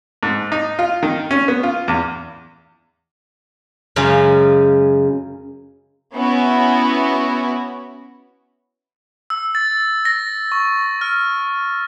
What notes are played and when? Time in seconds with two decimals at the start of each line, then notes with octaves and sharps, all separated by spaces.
0.23 G#2
0.52 D#4
0.79 F4
1.03 D#3
1.31 C#4
1.48 B3
1.63 F4
1.88 E2
3.96 F#2 C#3 G#3 C#4 F5
6.13 B3 C#4 E4 F#4
9.30 E6
9.55 A6
10.05 A#6
10.52 C#6
11.01 F6